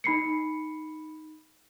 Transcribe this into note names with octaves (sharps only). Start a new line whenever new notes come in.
D#4 B5 C7 C#7